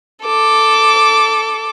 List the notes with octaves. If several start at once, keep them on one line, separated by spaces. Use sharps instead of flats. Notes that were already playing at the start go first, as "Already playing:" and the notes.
A4 D6